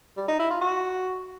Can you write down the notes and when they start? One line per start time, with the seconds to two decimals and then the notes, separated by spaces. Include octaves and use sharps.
0.17 G3
0.28 D#4
0.39 E4
0.50 F4
0.61 F#4